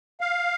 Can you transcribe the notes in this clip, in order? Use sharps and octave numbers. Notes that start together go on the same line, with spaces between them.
F5